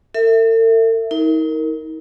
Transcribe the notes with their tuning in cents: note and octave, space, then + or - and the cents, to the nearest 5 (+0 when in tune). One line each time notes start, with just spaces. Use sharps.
A4 +45 E5 +0
D#4 +40 A#4 -10